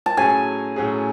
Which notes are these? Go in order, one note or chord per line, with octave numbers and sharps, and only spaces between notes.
A5
A2 F#3 C#4 G#4 G#5
A2 F#3 C#4 G#4